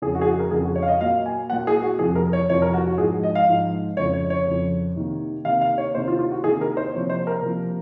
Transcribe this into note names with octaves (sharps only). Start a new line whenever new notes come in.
F2 C#3 F3 G#4
F#4
G#4
F#4
A#4
F2 C#3 F3 G#4
F#4
C#5
F5
D#5
A#2 F#3 A#3 F5
G#5
A#2 F#3 A#3 F#5
G#4
F#4
F2 C3 F3 G#4
A#4
C#5
F2 C3 F3 C#5
A#4
F#4
F#4
G#2 F3 G#3 G#4
D#5
F5
G#2 F3 G#3
F2 C#3 F3 C#5
C#5
C#5
F2 C#3 F3
C3 D#3 A#3
C3 D#3 A#3 F5
F5
C#5
C3 D#3 A#3 C5
F4
F4
F#4
C3 D#3 A#3 G#4
A#4
C5
C3 F3 A#3 C#5
C5
A#4
C3 F3 A#3